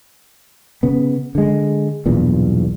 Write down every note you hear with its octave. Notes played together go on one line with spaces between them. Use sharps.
C#3 B3
D3 G#3
B1 E2 G2 A#2